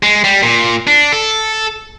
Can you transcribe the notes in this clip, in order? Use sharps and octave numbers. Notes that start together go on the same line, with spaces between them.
G#3
G3
A#2
D4
A4